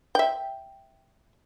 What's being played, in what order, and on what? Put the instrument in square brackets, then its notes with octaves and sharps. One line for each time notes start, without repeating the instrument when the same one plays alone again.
[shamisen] E5 G5